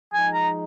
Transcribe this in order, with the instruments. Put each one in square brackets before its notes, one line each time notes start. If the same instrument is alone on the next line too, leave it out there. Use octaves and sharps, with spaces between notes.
[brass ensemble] F3 G#3 D#4 [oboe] G#5
[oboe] A#5